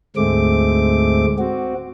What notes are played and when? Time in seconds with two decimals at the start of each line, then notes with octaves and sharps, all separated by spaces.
0.16 D2 G#2 G#3 A3 C4 D6
1.39 C4 F#4